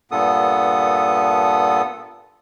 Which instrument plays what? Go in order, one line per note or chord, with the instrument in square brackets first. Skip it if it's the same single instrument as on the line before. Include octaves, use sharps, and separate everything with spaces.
[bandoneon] G2 A#2 B3 A4 D#6